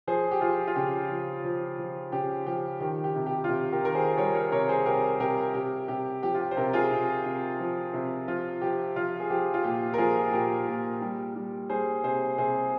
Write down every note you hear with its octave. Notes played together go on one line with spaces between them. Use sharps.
F3 G#4 C5
G4
F3 F4 G#4
F4
C#3 G4
F3
F3
F3
C#3 G4
F3 G4
D#3 G4
G4
C3
G4
F4
C3 G4
G4 A#4
D#3 A#4
G#4 C5
G3 A#4 C#5
A#4 C#5
C3 A#4 C#5
G#4 C5
C3 G4 A#4
C3 G4 A#4
C3 G4
C3 G4
F3 G4
F4
G4
C5
C3 G4 A#4
F4 G#4
C3
C3
F3
C3
F3 F4
F3 G4
F3 F4
G#4
F3 G4
F4
A#2 G4
A#4
F3 F4 G#4
A#2 G4 A#4
A#2
G3
G3
G3 G#4 C5
C3 G#4 C5
C3 G#4 C5